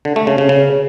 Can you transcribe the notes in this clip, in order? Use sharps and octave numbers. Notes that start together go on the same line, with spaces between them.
D3
A3
C#3
C#3
C#3